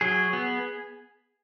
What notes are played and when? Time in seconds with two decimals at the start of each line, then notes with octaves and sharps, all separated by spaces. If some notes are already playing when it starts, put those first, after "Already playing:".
0.01 F#3 G#4
0.33 B3